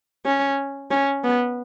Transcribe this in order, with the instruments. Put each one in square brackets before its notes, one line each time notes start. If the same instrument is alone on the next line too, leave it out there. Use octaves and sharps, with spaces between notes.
[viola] C#4
C#4
B3